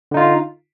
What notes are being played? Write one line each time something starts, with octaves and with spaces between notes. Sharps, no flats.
D3 D#4 F4